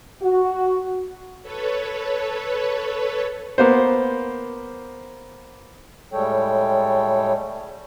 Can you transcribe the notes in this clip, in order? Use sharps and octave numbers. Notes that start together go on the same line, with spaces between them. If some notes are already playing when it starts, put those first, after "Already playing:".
F#4
A4 B4 C#5
A#3 B3 C5
A2 G3 G#3 A4 C#5 G5